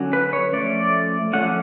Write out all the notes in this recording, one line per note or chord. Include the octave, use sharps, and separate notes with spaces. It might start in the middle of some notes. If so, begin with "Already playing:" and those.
Already playing: D3 F#3 C#4
B4
C#5
F3 A3 C#4 D5
F3 A3 C#4 F#5